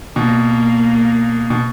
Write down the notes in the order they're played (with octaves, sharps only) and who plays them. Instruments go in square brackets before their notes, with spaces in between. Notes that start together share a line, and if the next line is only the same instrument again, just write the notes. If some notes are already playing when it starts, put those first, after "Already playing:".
[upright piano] B2 [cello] A#3
[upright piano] B2